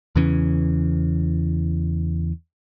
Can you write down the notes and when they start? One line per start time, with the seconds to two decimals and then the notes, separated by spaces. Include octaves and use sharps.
0.16 E2 C#3 E3 C#4